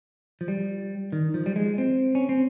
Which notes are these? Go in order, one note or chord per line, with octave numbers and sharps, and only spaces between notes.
F3
G3
D#3
F3
G3
G#3
C4
C#4
C4